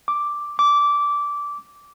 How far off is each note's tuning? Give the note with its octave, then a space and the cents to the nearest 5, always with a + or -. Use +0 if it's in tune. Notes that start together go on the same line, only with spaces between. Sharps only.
D6 +0
D6 -15